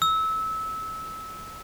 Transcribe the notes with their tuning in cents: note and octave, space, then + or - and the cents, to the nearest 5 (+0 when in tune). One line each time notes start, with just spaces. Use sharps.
E6 -20